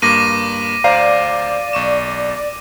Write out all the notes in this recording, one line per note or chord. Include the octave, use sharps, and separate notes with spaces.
G2 A#3 D6 A#6 D#7
D2 C5 D5 F5 A#5
B1 C#6 E7